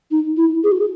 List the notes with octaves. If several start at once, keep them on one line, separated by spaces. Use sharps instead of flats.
D#4
E4
G#4
F#4
G#4